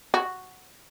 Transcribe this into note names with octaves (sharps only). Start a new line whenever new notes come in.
F#4